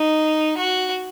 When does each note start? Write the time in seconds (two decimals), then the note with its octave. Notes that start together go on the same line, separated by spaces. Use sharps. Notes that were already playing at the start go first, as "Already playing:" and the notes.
Already playing: D#4
0.57 F#4